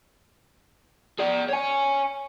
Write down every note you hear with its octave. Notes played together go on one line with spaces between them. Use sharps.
G#4 D5
C#5 G#5